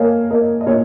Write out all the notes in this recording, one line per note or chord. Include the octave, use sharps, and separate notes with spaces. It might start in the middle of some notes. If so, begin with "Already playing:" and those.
Already playing: A#3 C#5 D#5 F5 G#5
A#3 A#4 D#5
D#5
A#2 C#5